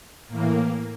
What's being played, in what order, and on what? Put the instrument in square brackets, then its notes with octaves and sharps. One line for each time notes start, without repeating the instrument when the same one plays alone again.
[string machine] A2 E3 A#3